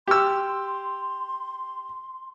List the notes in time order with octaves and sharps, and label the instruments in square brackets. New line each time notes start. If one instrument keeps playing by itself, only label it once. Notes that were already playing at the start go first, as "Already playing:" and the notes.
[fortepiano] G4 E6 [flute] C6